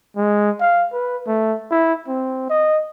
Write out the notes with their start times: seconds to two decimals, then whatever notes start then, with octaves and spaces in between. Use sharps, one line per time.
0.16 G#3
0.60 F5
0.93 B4
1.27 A3
1.71 E4
2.08 C4
2.50 D#5